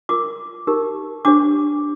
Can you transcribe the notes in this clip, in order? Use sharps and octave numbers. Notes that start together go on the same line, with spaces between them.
F4 A#4 D6
D#4 G4 A#4
D4 G4 C5 D6